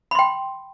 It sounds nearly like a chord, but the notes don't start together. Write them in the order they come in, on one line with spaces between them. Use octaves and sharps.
B5 C6 G5